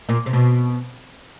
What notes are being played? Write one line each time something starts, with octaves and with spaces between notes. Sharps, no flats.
A#2
C3
B2